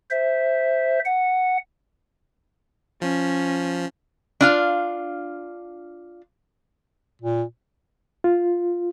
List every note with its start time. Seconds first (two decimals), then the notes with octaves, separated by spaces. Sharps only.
0.11 C5 E5
1.05 F#5
3.02 F3 C#4
4.41 D4 F4 F5
7.21 A#2
8.24 F4